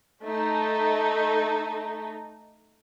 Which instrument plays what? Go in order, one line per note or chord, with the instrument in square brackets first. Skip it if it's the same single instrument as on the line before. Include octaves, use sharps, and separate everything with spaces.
[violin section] A3 D#4